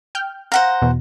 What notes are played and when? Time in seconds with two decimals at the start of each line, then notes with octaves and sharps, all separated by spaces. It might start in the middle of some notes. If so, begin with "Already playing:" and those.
0.15 G5 F6 G6
0.52 C5 F5 F#5 A#5 A#6
0.82 E2 B2